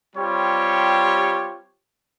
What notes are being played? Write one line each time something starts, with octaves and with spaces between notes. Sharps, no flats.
G3 C4 F4 G4 C#5